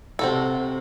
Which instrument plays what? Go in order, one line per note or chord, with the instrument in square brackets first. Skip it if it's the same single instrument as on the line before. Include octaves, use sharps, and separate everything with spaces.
[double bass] C3 [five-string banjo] C4 F#4 A4